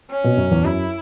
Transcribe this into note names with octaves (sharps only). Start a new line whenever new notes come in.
C#4
B2
F#2
E2
F#2 E4